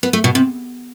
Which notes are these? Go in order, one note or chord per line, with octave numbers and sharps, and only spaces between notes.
B3
A3
B2
C3